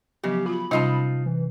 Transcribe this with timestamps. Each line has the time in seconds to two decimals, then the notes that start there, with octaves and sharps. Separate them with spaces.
0.24 C#3 F3 F#3 B3 G4
0.46 F4 F#4 B5
0.71 C3 G3 C#4 D#4 F4 D#5 A5
1.26 E3